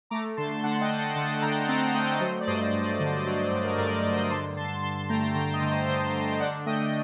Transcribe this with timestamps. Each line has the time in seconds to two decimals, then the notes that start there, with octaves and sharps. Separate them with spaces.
0.10 A3 A#5 D6
0.37 D3 A5 C6
0.63 D3 F#5 A5
0.81 D#5 G5
0.90 D3
0.98 F#5 A5
1.16 D3 F#5 A5
1.42 D3 G5 A#5
1.68 C4 F#5 A5
1.95 A3 D#5 G5
2.20 F#3 C5 D#5
2.41 D5
2.47 G2 C5 D#5
2.73 G2
3.00 D3
3.26 F#3
3.52 G2
3.64 A#4
3.71 C5
3.78 G2 A#4 D5
3.96 A#4 D5
4.04 G2
4.13 C5 D#5
4.30 D3 A5 C6
4.56 D3 A5 C6
4.82 D3 A5 C6
5.09 A3 G5 A#5
5.35 D3 G5 A#5
5.53 D#5 G5
5.62 D3
5.70 C5 D#5
5.88 D3 C5 D#5
6.14 D3
6.40 D4 D5 F#5
6.66 A3 D#5 G5